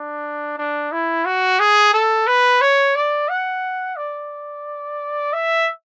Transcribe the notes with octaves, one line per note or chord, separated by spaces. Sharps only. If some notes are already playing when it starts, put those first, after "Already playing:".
Already playing: D4
D4
E4
F#4
G#4
A4
B4
C#5
D5
F#5
D5
E5